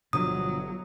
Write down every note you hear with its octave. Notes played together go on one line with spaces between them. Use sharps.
G1 B2 D3 F3 F#3 D#6